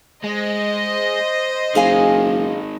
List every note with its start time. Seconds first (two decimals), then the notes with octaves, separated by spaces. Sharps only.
0.24 G#3 C5 D#5
1.75 F#1 D#3 G#3 G#4 F5 G#5